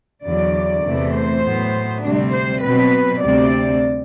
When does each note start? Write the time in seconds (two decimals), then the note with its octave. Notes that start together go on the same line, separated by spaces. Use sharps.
0.24 E2 D3 F#3 D5
0.84 E2 C3 E3 A3
1.14 C5
1.44 A2 F#3 B3
2.04 D2 C3 G3 C4 D4
2.33 C5
2.63 B2 F#3 C4 B4
3.23 D2 C3 G3 C4 D5